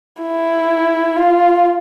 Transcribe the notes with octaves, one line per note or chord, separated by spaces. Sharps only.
E4
F4